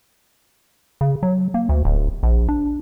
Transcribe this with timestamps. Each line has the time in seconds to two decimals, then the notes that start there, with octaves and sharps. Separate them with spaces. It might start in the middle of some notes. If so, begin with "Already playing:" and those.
1.01 C#3
1.23 F#3
1.54 A#3
1.69 D2
1.85 D1
2.23 A#1
2.49 D4